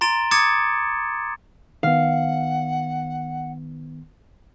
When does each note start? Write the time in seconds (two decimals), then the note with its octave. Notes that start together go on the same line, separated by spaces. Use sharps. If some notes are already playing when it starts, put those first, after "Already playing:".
0.01 A#5 C6 A6 D7 E7 G7
0.31 D6 D#6 G#6 A6 C#7 E7
1.83 D#3 B3 F5 F#5